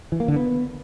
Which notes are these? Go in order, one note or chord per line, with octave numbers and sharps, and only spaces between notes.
E3
A#3
D3
B3